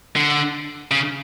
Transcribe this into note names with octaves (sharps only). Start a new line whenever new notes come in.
D3
C#3